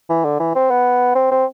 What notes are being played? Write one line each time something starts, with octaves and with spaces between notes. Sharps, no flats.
E3
D3
E3
C4
B3
C4
C4